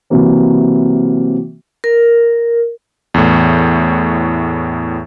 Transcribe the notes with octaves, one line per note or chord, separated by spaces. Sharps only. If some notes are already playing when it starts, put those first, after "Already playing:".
C3 E3 F#3 A#3 C4
A#4
E2 A2